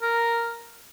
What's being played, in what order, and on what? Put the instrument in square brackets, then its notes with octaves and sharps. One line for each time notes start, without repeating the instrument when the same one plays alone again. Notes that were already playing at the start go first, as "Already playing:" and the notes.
[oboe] A#4